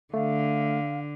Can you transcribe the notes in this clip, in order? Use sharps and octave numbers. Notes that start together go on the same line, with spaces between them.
D3 A3 F5